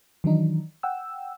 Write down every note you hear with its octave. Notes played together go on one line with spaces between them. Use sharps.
D#3 E3 F#3 D4 D#4
F#5 G5 E6